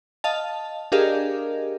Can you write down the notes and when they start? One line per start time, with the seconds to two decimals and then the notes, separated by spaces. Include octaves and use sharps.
0.24 D#5 F5 A5
0.92 D4 G4 G#4 A#4 D#5 F5